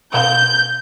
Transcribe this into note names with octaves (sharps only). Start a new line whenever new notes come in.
B2 F5 G6